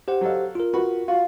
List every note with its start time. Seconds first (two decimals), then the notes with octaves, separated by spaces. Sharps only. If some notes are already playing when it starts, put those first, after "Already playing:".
0.08 G4 C5 F#5
0.21 F#3 A4 F5
0.55 F4 A#4
0.74 F#4 B4 B5
1.08 F4 F#4